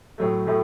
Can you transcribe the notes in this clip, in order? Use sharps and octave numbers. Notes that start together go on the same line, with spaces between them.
A2 F#3 A3
A2 F#3 A3